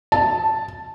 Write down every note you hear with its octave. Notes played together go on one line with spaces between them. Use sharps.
A5